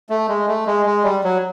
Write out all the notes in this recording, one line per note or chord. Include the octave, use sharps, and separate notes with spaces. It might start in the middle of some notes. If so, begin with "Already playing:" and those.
A3
G#3
A3
G#3
G#3
G3
F#3